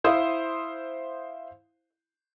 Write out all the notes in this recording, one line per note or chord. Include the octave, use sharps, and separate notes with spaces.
E4 C5 F5 D#6